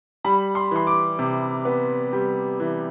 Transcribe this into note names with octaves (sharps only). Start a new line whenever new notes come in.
G3 B5
C6
E3 C6
D6
C3
B3
G3
E3